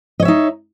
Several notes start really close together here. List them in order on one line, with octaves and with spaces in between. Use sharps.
D#5 C#5 E5 D#4